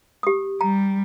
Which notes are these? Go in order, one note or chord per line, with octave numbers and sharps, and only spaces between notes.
G4 D#6
G3 A#5